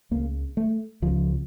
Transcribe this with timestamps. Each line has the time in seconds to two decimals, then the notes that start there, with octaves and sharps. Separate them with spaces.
0.11 C#2 C#3 A#3
0.57 A3
1.02 C#2 C#3 F3